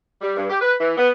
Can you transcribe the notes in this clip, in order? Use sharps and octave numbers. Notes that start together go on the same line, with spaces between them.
G3
G2
G4
B4
E3
B3